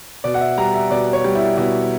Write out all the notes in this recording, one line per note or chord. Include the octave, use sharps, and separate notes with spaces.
B2 D5
F#5
E5
G3 A#5
E5
B2 D5
C#5
G3
E4
B2 E4